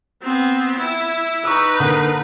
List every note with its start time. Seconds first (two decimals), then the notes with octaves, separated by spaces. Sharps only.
0.22 B3 C4
0.78 E4
1.45 D#4 B4 A#5 C#6 E6
1.80 D3 A#3